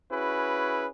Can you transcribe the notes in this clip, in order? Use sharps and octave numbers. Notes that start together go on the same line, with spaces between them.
C#4 E4 F#4 G#4 B4